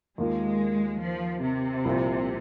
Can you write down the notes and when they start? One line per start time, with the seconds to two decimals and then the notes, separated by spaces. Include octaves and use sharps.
0.18 D#2 D#3 G#3 A#3 F4
1.01 F3
1.43 C3
1.85 C2 A#2 F3 C4